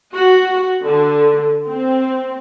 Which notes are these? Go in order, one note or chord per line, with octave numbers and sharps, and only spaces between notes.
F#4
D3
C4